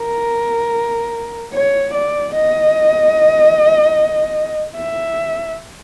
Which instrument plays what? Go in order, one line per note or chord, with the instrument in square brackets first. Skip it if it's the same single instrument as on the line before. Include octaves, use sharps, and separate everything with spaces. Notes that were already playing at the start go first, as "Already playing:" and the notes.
Already playing: [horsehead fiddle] A#4
C#5
D5
D#5
E5